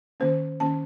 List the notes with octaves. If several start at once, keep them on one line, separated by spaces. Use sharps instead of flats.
D#3 A#3 C#4 C5
D#3 A#3 C#4 A5